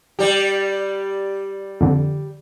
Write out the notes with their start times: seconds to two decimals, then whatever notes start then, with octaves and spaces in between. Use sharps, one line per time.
0.19 G3 G4
1.81 F2 D3